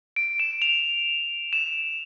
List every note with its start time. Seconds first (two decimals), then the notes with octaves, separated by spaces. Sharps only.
0.16 D7
0.40 E7
0.62 F7
1.53 E7